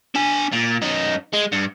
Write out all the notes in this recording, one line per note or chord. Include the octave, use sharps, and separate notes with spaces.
D4 G#5
A#2
F#2 D#4
G#3
G2